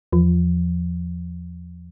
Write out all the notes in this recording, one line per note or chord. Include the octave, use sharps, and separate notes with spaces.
E2 F3